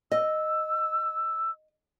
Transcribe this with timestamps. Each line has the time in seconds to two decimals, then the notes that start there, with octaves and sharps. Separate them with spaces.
0.12 D#5 E6